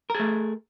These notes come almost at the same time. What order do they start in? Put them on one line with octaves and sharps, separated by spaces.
A#4 G#4 A3